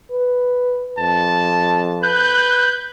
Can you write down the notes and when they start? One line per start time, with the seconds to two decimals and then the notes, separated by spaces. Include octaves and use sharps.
0.11 B4
0.99 F2 A5
2.03 B4 F#6 G6